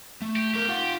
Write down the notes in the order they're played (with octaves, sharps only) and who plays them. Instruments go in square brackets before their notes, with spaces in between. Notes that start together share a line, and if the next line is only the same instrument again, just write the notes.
[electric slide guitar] A3
[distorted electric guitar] G4
[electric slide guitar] A3 A#4 [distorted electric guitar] G4
[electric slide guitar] F4 F5 F#5